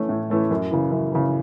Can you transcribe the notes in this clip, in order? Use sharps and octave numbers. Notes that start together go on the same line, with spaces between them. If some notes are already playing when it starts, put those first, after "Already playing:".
Already playing: E3 A3 C#4
A2
E3 A3 C#4
F#2
C#3 E3
F#2
C#3 E3